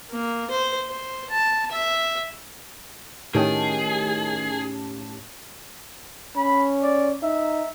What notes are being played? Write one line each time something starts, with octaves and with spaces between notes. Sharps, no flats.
A#3
C5
C5
A5
E5
A2 D#3 C#4 D#4 G4 G#4 A5
C#4 B5
D5
D#4 E5